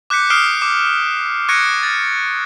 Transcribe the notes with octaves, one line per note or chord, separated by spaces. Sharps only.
D6 F#6 G6 B6 C#7
D#6 F6 C7 D7 E7
D6
C#6 F#6 G#6 A#6 C#7 D7
A6